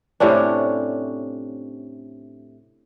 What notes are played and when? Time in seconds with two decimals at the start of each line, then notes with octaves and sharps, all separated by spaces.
0.20 A2 C3 C#4 D4